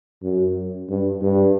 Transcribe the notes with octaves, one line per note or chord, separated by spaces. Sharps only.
F#2
G2
G2